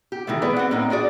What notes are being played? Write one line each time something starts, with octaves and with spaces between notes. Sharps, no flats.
G4
D#3 E3 G#3 A3
E3 B3 G#4 B4 D5
C4 F#5
A2 A#3 C4 D#4
D4 F#4 G#4 D5